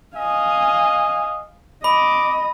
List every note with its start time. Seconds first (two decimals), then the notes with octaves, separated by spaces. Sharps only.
0.17 D#5 F5 G#5
1.84 D#5 B5 D6